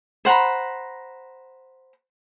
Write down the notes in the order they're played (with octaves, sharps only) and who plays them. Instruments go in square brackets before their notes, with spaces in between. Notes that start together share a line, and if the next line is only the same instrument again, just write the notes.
[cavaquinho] C5 F#5 A#5 B5